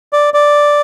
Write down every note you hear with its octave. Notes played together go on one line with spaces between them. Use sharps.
D5
D5